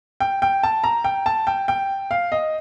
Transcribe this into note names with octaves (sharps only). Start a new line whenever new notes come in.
G5
G5
A5
A#5
G5
A5
G5
G5
F5
D#5